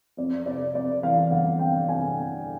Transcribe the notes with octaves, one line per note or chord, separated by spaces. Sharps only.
F2 D5
C3 D5
F2 D5
E3 F5
G1 F#5
F2 G5
C3 G#5
C3